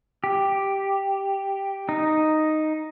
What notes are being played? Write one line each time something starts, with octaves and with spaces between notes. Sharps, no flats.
G4
D#4